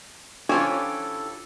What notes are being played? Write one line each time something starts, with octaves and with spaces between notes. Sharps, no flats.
E3 C#4 D4 F4 G4 A4 C5 C#5